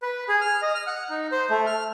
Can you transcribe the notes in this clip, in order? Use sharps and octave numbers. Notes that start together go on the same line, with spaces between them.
B4
G#4
F6
D#5
F6
F#5
D#4
C5
A3
F6